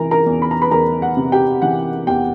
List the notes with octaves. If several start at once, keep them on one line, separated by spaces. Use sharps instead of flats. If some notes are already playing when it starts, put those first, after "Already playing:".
Already playing: C3 E3 A#4 A#5
A#4 A#5
E2
B5
A#5
B4 B5
E2 A#4 A#5
F#5
C3
G4 G5
E3 F#5
E2 G4 G5